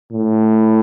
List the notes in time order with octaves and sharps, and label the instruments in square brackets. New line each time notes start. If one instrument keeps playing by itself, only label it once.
[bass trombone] A2